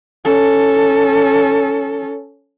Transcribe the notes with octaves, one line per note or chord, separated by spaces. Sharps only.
C#4 A4